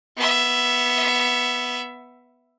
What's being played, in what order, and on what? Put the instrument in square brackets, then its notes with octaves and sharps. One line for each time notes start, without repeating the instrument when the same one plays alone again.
[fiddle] B3 E5